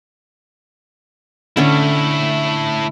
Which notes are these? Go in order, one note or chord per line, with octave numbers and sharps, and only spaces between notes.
D3 A3 C#4 E4